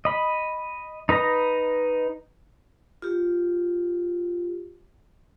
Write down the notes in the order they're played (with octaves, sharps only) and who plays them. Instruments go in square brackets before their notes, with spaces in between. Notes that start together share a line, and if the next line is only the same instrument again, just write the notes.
[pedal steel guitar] D#5 B5
D#4 B4 D#5 A#5
[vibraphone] F4 G4